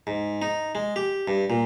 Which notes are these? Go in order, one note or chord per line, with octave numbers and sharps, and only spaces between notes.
G#2
D#4
G#3
G4
G2
A#2